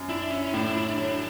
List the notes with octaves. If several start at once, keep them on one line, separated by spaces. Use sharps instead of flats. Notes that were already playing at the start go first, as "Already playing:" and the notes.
Already playing: F#2
D4 E4
C#4 E4
A2 D4
E4
F#3